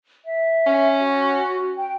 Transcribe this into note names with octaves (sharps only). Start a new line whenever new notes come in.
E5
C#4
F#4
G5